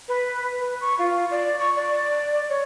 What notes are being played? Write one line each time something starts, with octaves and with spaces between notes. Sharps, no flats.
B4
B4
C#6
F4
D5
C#6
D5
C#5